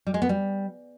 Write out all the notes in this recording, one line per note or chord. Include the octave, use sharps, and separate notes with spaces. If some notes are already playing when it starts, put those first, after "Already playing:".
G3
G#3
B3
G3